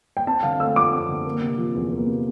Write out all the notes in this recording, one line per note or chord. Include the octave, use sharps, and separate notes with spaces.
G5
C4 A5
D3 F5
A3 E6
F2 D6
C4
D3
A#3
C3
F3
E2
A#3
C3